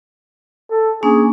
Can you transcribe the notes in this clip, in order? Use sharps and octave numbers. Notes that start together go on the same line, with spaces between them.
A4
A#3 C#4 D4 G#4